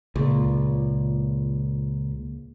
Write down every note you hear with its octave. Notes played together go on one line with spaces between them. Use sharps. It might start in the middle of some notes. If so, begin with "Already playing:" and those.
C#2 A#2